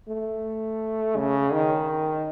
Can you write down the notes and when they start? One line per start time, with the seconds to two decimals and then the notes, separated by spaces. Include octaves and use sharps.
0.08 A3
1.16 C#3
1.53 D#3